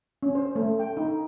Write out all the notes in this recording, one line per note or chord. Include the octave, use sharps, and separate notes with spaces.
C#4
C5
A3
G5
D#4